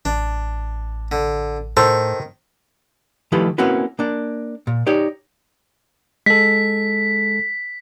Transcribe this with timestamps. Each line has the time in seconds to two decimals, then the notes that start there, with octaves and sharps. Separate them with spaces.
0.05 A1 D4
1.12 D3
1.77 A2 D#3 A4 C5 C#6
3.32 D#3 F3 A3 E4 G4 B4
3.58 A#3 C4 C#4 E4 F#4 B4
3.99 A#3 D4
4.67 A#2
4.87 D#4 G4 C#5 D5
6.26 G#3 A4 B6